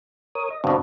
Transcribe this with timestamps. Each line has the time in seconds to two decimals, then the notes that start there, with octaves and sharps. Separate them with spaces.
0.35 A#4 C#5 D#6
0.50 D#5
0.64 G2 B2 D3 C4 F#4